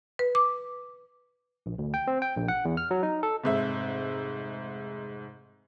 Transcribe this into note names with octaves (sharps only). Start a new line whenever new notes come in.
B4
D6
A#1
D2
G5
C4
G5
A#1
F#5
E2
F6
F#3
D#4
A4
F1 G#2 E5